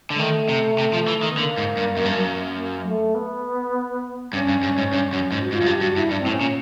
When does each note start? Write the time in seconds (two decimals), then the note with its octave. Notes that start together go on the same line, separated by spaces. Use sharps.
0.10 D3
0.14 G#3
0.19 D#3 A3
0.49 C3
0.79 C3
0.93 F3
1.08 E3
1.23 D#3
1.29 B3
1.37 D3 A#3
1.58 G#2
1.77 G2
1.97 F#2
2.05 G2
2.15 F#2
2.55 A#3
2.86 A3
3.15 B3
4.33 G2 C#4
4.49 G2
4.63 G2
4.78 G#2
4.93 G2
5.13 F#2
5.32 G#2
5.41 F#4
5.52 G#2 F4
5.61 F#2
5.66 G2 G4
5.81 G2 F#4
5.96 G2 E4
6.11 G2 D4
6.21 C4
6.26 A2
6.31 C#4
6.41 A#2